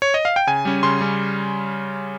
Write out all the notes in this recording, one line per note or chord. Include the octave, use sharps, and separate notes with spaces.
C#5
D#5
F5
G5
C#3 G#5
G3 C#4
C#3 C6
G3 C#4